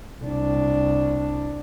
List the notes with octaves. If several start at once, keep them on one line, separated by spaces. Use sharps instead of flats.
C2 D4